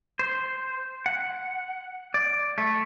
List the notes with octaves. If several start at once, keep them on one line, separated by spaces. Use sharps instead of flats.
C5
F#5
D5
A3